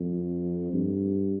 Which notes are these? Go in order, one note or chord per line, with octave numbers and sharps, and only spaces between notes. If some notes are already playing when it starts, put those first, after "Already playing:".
Already playing: F2
G2